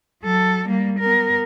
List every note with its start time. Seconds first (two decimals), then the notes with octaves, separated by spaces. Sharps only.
0.24 F#3 A4
0.67 G3 A#3
1.00 B3 A#4